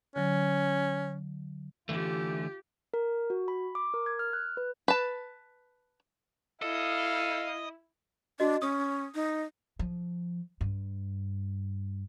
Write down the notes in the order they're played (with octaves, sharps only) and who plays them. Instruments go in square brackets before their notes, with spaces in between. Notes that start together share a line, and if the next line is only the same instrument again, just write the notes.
[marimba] D3 F#3 [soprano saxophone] C#4
[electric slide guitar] D3 E3 A3 [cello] F4 G4
[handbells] A#4
F#4
B5
D6
A#4
G#6
F6
F#6
B4
[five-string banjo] B4 A5
[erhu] E4 [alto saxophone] A4 [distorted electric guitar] D#5 [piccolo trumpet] F5
[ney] D4 [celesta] F#4 D#5
[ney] C#4 [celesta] D#6
[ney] D#4
[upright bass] F3
G2